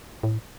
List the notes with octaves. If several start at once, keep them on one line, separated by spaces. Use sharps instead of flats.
A2